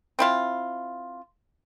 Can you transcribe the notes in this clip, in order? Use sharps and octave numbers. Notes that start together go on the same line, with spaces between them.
C4 E4 F4